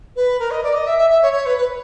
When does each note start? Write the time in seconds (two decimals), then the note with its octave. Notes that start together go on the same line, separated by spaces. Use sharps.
0.16 B4
0.39 A#4
0.51 D#5
0.64 D5
0.74 D#5
0.87 E5
0.98 E5
1.10 E5
1.22 C#5
1.33 C#5
1.46 B4
1.57 B4